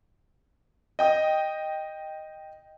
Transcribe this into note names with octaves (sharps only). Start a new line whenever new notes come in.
D#5 G5 D#6